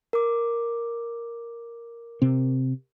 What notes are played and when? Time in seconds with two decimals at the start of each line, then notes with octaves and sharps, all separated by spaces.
0.13 A#4 D6
2.22 C3 C4